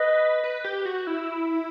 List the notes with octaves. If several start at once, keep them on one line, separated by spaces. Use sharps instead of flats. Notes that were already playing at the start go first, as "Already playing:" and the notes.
Already playing: B4 D#5
B4
G4
F#4
E4